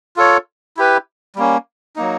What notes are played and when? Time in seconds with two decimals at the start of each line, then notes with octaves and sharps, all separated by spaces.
0.17 F4 A4 C#5
0.77 E4 G4 B4
1.36 G3 A#3 C#4
1.96 F#3 A#3 D#4